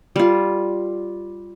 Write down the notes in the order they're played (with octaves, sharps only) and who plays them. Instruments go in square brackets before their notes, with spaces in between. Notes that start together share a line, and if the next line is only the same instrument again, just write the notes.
[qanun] G3 F4